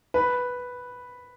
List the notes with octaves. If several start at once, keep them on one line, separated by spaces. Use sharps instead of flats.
B4